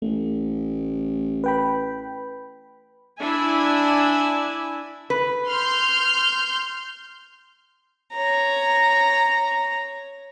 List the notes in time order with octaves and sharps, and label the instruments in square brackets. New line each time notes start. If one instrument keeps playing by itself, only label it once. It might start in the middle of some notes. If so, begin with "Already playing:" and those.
[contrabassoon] A1 [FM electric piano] A3
[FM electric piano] B4 G5 B5
[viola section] D4 E4 E5 G#5
[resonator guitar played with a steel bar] B4
[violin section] C6 F6 G6
[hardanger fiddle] C#5 A#5